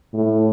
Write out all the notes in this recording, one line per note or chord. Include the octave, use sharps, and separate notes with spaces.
A2